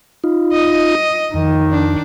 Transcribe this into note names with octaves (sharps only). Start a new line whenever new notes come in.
D#4 F4
D#5
F2 D#3
D4